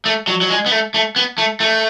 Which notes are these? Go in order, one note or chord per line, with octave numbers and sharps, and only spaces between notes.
A3
F#3
F#3
G#3
B3
A3
A3
B3
A3
A3